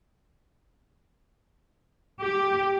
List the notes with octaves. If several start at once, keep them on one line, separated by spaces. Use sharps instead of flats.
G4